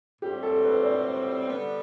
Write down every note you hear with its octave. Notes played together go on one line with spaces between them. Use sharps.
A2 G3 C4 F#4 G4
A4
B4
D5
C5
D3 G3 B3